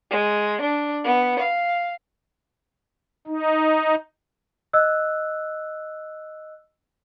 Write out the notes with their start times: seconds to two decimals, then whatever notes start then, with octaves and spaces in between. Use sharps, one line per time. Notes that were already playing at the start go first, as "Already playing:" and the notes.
0.11 G#3
0.61 D4
1.04 B3
1.40 F5
3.27 D#4
4.73 D#5 E6 F#6